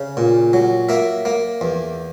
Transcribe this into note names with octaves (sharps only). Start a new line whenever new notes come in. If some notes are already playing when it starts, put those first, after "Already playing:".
Already playing: C#3
A#2
F#3
A#3 E5
A#3
E2